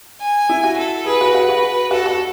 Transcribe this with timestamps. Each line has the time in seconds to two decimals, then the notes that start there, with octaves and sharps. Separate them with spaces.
0.21 G#5
0.49 E4
0.64 F#4
0.78 A4
1.06 G#4 B4
1.21 F#4
1.35 F#4 B4
1.49 F#4
1.91 F#4 A4
2.06 F#4